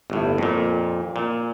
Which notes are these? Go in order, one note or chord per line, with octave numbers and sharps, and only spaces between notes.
G1 A2
F2 A#2
A#2